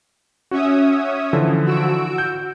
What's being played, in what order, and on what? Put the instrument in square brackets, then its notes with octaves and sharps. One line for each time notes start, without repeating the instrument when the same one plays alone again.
[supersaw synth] C#4 E5 D#6 [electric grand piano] F#4
[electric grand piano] D3 E3 F3
[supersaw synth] F#4 E6 D7
[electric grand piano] G6